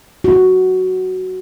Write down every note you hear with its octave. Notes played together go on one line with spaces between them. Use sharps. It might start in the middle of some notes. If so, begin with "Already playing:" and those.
F#4